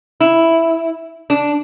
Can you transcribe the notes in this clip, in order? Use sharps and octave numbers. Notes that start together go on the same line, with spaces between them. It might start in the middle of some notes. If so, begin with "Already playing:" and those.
E4
D4